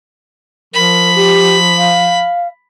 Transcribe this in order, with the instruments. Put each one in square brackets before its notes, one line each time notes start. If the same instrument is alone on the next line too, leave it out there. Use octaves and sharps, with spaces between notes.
[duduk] F3 [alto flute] A#4 [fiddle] B5
[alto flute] G4
F5